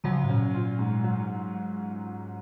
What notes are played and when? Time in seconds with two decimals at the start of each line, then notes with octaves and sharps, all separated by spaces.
0.04 C#3 F3 F#3
0.23 G#2
0.29 A#2 C#4
0.54 A#2 F4
0.79 G#2
1.04 F#3